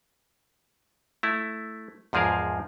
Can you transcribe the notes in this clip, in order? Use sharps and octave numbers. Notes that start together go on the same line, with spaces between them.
A3 E4
E2 G#2 F3 G#4 A#4 F5